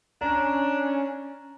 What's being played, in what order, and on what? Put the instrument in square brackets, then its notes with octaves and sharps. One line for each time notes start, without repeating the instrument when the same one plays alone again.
[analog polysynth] C#4 [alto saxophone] D4 [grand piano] A#5